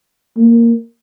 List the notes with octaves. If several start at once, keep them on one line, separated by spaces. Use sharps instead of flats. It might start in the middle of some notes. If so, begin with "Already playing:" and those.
A#3